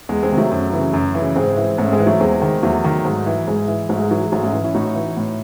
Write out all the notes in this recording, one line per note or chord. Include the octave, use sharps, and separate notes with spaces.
E2 G#3
G#3 C4
C3 D#3
F#3 A3
F#2
C#3 E3
F#2
C#3 E3
G#2 G#3 C4
E3
G#2 A3 C#4
G#3 C4
E3
F#3 A3
E2 G#3 C4
D#3
E2 F#3 A3
D#3
G#2
E3
G#2 G#3
E3
G#2 F#3 A3
G#3
E3 F#3
G#3
G#2 F#3 A3
A3 C#4
E3
C#4 E4
A2 D#4 F#4
E3
A2